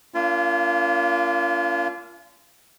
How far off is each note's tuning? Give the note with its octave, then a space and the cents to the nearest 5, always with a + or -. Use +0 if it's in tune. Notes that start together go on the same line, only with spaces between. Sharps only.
A#3 +0 C#4 +45 F4 -30